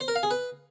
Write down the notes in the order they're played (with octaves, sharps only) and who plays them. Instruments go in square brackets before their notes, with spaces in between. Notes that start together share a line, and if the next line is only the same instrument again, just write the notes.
[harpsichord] C5
A#4
F5
G#4
B4